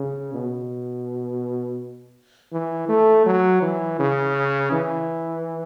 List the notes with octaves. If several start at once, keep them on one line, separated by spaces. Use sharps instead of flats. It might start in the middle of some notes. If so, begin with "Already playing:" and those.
Already playing: C#3
B2
E3
A3
F#3
E3
C#3
E3